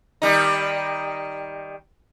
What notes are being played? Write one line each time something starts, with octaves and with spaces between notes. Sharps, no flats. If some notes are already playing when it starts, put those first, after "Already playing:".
D#3 G3 D#4